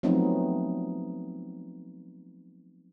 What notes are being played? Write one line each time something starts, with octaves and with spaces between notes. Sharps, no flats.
F3 F#3 A3 B3 C4 D#4